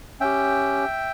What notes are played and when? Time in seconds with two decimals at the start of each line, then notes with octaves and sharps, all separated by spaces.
0.20 C#4 G4 E5 G5